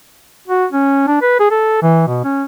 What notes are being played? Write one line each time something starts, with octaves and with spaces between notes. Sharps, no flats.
F#4
C#4
D4
B4
G#4
A4
E3
B2
C#4